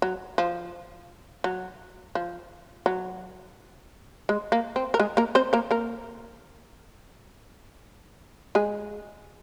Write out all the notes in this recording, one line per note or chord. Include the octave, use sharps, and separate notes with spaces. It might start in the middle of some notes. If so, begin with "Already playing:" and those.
F#3
F3
F#3
F3
F#3
G#3
A#3
C4
A#4
G#3 G#4
A#3 A#4
C4 C5
A#3 A#4
A#3 A#4
G#3 G#4